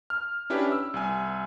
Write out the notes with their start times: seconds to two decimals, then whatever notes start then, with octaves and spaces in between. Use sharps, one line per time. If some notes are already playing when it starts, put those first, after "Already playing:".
0.10 F6
0.50 C#4 D4 E4 G4 B4
0.72 E6
0.94 C2 G#5